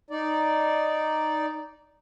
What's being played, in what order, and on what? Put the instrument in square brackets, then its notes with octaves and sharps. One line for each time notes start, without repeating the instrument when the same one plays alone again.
[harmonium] D#4 D5